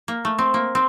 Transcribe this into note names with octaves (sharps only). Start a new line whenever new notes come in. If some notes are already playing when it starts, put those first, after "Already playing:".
A#3
A3
C4
A#3
C4